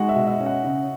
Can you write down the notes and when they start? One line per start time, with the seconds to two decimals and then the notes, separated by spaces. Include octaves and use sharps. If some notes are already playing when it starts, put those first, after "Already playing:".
Already playing: G#3 D#4 F#4 D#5 F#5
0.09 E5
0.16 B2
0.27 E5
0.40 C#4
0.46 F#5
0.64 C#3